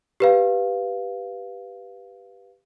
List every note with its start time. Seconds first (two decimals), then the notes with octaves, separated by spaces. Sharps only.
0.20 G4 B4 F5